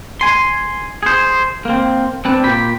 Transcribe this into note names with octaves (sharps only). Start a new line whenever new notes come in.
G#5 C6
G#4 C5
A#3 C4
C4 D4 B4
A#2 G4 B5